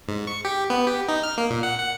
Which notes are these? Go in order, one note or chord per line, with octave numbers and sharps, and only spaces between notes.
G#2
C#6
G4
B3
G4
D#4
F6
A#3
A#2
F#5
F#5